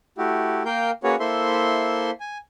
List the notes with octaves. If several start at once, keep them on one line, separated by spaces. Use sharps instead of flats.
A3 E4 F#4 G4
A#3 A#4 F5 G5 G6
A#3 C#4 F#4 G#4 B4 C#5
A#3 E4 A4 C5 E5 C6
G#5